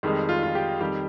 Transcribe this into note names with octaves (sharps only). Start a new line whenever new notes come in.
F2 D#3 G3 G#3
F4
F4
G4
F2 D#3 G3 G4